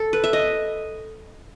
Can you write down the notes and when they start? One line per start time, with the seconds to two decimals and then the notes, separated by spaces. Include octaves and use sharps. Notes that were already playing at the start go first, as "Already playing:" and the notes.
Already playing: A4
0.13 B4
0.24 E5
0.33 D#5